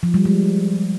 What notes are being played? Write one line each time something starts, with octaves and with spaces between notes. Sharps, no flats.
F3
G3
G#3